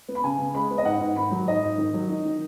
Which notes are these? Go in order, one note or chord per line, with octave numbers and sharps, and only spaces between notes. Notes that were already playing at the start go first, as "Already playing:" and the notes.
B3
B5
C#3 G#5
C#3
G#3 B5
B3
D#5
G#2 F#5
G#2
D#3 B5
F#3
G#2 D#5
G#2
D#3
F#3
D#4
D#3